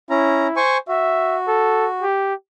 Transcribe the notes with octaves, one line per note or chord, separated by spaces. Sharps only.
C#4 E4 A#5
C5 G#5 C#6
F#4 E5
A4
G4